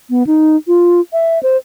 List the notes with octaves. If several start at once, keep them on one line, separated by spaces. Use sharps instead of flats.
B3
D#4
F4
E5
C5